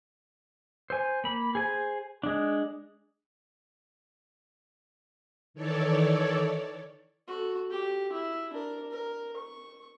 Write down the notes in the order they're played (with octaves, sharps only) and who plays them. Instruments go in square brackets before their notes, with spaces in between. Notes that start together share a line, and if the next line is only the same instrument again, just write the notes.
[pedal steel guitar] C5 G#5
A#3 B5
G#4 C5 G#5
G#3 D4
[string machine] D#3 E3 A4 C#5 D5
[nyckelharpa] F#4 A4
G4
E4
D4 A#4
A#4
C#6